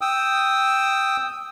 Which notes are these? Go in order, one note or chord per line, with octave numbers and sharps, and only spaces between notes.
G5 D#6 E6